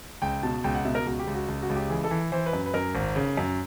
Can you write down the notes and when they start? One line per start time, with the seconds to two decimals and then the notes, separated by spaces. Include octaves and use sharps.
0.22 C#2 G5
0.43 B2 A5
0.64 C#2 G5
0.75 F#5
0.85 B2 E5
0.95 A#4
1.06 C#2 F#4
1.19 G4
1.27 C#2
1.34 F#4
1.48 C#2
1.62 F#4
1.70 C#2
1.76 G4
1.90 E3 G#4
2.04 A4
2.11 E3
2.32 E3 C5
2.46 B4
2.53 F#2
2.66 B4
2.74 F#2 A#4
2.95 G#1
3.16 C#3
3.37 F#2